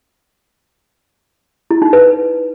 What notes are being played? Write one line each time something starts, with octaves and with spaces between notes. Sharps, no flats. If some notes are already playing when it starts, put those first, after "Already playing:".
E4
D#4
B4